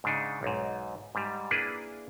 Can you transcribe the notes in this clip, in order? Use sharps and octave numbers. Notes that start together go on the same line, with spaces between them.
G#2 C#3 D4 D#4
B1 G#2
G#2 G3
A#3 D4 E4 G#4 B4